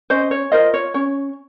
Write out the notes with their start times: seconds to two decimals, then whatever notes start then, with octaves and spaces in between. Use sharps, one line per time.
0.10 C#4 C5 D#5
0.31 C#5
0.52 F4 A#4 C5 D#5
0.74 C#5
0.94 C#4 C#5